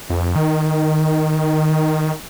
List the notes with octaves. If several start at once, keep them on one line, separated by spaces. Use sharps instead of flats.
F2
D#3